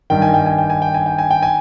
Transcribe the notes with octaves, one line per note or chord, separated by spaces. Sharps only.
G2 D#3 G5
G#5
G5
G#5
G5
G#5
G5
G#5
G5
G#5
G5
G#5